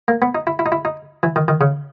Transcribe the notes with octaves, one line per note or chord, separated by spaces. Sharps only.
A#3
B3
D#4
E4
E4
D#4
E4
D#4
E3
D#3
D#3
C#3